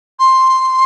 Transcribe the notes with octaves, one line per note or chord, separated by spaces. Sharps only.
C6